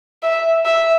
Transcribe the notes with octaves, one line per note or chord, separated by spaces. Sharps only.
E5
E5